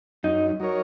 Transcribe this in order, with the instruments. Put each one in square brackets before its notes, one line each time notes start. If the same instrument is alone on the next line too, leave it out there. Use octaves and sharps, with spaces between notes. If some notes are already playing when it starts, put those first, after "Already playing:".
[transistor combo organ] F#2 [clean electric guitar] D#4
[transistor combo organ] F#3 D#4 A#4 C#5